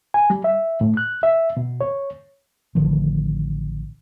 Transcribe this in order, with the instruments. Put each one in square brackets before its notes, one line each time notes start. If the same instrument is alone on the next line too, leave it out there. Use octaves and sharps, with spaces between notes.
[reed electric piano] G#5
G3
E5
A2
F#6
E5
B2
C#5
[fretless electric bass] A1 D3 D#3 F3